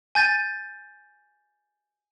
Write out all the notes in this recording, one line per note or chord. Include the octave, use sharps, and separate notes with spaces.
G#5 G6 A6 D#7